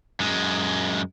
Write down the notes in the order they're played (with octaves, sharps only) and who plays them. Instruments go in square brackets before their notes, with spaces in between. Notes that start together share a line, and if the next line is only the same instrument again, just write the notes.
[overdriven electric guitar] F#2 G#3